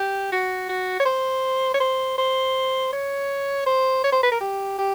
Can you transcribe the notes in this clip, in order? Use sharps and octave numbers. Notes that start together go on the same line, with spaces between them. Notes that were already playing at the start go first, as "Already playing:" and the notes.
Already playing: G4
F#4
F#4
C#5
C5
C#5
C5
C5
C#5
C5
C#5
C5
B4
A#4
G4
G4